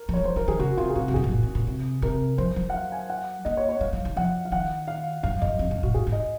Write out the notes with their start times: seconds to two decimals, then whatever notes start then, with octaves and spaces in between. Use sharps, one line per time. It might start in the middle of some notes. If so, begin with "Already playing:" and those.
Already playing: A#4
0.09 F3
0.14 F#3 C#5
0.24 G#3 C5
0.36 F3 A#4
0.48 D#3 G#4
0.59 C#3 F#4
0.77 C3 F4
0.90 G#4
0.96 C3 F#4
1.08 F2
1.14 F#2 G#4
1.24 G#2
1.31 A#2
1.43 C3
1.55 A#2
1.67 C3
2.02 C3 A#4
2.38 F3 C5
2.56 F#3
2.70 F#5
2.74 F5
2.92 G#5
3.10 F#5
3.45 A#3 D#5
3.57 C#5
3.69 C#5
3.81 G#3 F5
3.93 F#3
4.05 D#3
4.16 F3 F#5
4.45 F5
4.52 D#3 F#5
4.88 F5
5.23 F#2 F5
5.42 F#2 D#5
5.59 F2
5.71 F#2
5.83 A#2 F#4
5.94 G#2 G#4
6.07 G#2
6.12 D#5